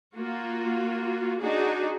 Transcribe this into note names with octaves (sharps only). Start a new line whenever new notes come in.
A#3 F4 F#4
D4 D#4 F#4 G#4 D5